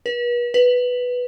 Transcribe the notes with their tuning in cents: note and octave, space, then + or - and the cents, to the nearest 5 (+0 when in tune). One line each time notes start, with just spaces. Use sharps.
B4 -40
B4 +0